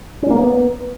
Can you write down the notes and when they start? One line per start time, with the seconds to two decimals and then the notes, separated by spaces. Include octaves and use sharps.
0.22 C#4
0.30 A#3
0.38 B3